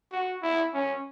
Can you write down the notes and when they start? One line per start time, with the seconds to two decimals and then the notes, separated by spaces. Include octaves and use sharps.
0.12 F#4
0.43 E4
0.74 C#4